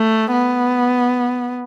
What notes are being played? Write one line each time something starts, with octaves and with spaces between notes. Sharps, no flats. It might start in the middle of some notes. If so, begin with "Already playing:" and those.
Already playing: A3
B3